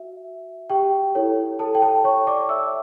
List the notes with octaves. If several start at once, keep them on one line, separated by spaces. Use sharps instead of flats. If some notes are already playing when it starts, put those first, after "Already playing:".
Already playing: F#4 E5
G4 G5
E4 A4 C#5
A4 A5
G5
A4 A5
C#5 C#6
D5 D6
E5 E6